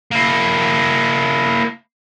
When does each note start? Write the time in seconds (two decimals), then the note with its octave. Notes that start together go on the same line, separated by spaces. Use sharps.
0.12 A#3 E4